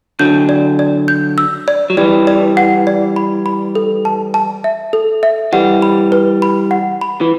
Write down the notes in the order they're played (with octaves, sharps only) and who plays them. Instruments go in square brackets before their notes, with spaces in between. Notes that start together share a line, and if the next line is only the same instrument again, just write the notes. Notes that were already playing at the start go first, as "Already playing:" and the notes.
[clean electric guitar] D3 F#3 [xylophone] G6
[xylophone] D5
D5
G6
E6
D5
[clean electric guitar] F#3
[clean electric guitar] E3 G3 [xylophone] D5
[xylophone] D5
F#5
D5
B5
B5
A4
A5
A5
E5
A4
E5
[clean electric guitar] E3 G3 [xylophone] F#5
[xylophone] B5
B4
B5
F#5
B5
[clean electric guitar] E3